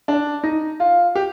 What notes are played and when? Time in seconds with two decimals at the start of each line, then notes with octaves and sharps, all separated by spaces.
0.08 D4
0.43 D#4
0.80 F4
1.15 G4